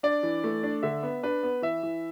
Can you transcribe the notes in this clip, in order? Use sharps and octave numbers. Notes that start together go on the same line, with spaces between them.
D4 D5
E3
A3
D4
D3 E5
B3
D4 B4
B3
E3 E5
E3